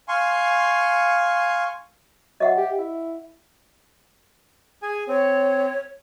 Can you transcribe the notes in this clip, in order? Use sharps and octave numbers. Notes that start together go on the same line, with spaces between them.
F5 G#5 C6 C#6
F#3 D#5 E5 F#5
G4
E4
G#4 G#5
C4 C#5